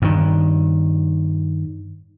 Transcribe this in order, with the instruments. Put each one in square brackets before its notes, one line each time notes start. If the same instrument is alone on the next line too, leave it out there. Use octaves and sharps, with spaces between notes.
[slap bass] G2 D#3